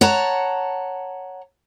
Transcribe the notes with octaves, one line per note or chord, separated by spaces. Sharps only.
C#5 F#5 A5 A#5